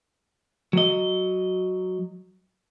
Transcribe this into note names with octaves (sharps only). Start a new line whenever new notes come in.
F#3 D#5